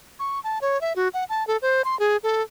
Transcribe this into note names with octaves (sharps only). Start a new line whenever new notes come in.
C#6
A5
C#5
E5
F#4
F#5
A5
A4
C5
C6
G#4
A4